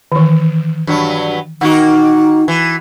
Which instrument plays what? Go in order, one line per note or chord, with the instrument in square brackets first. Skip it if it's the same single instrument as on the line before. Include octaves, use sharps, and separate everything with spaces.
[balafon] D#3 E3
[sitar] G2 F#3
[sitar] D#3 A#3 F#4 [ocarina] D#4 [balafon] F#5
[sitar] E3